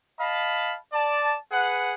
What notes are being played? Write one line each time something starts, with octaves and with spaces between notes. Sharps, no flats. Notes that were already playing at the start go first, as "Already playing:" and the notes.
D#5 F5 A5 B5
D5 A5
G#4 B4 F#5